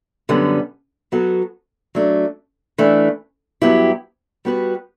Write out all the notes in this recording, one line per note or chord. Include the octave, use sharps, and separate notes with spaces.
F#2 D3 G3 B3
F#3 B3 F#4 A4
F#3 A3 D4
E3 A3 D4
G2 F#3 B3 E4 G4
G3 B3 F#4 B4